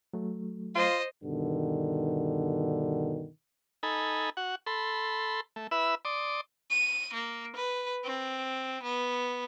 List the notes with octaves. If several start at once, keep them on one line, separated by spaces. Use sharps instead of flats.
F#3 A3
F4 C5 D#5
G2 B2 D3 D#3
D#4 A4 G#5 B5
F#4 F#5
A4 B5 C6
A3
E4 B4 E5 B5 E6
D5 C6 D6 D#6
D#7
A#3
B4
C4
B3